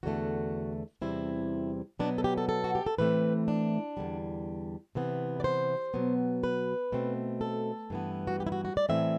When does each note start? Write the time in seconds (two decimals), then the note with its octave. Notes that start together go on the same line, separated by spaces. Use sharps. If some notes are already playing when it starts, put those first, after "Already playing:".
0.03 E2 D3 A3 F#4
1.02 E2 C3 G3 C4 E4
1.99 B2 F#3 B3 D4
2.18 A4
2.24 G4
2.38 A4
2.49 A4
2.64 F#4
2.75 G4
2.86 A4
2.98 A2 E3 A3 C4 B4
3.48 D4
3.97 E2 D3 G3
4.95 C3 E3 B3
5.40 D5
5.44 C5
5.94 B2 F#3 B3
6.44 B4
6.92 B2 A3 C4
7.41 A4
7.90 G2 E3 B3
8.27 F#4
8.40 G4
8.47 E4
8.52 F#4
8.65 F#4
8.77 D5
8.89 A2 E3 A3 C4 E5